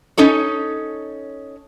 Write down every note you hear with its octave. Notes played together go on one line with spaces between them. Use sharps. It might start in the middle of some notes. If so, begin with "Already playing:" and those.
C#4 D#4 A4 C#5